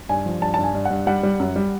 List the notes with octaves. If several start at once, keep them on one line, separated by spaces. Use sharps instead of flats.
G2 G#5
F3
G2 A5
G2 A5
G#5
G2
G2 F#5
G3 F#5
G3
F#2
G3